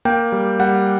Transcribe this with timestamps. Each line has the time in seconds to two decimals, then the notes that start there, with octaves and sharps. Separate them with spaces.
0.05 A#3 G5
0.32 G3
0.59 G3 F#5